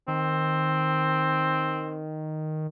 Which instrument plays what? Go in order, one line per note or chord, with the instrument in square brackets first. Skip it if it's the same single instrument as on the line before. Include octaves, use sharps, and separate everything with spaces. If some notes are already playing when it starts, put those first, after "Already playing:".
[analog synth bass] D#3 [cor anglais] C4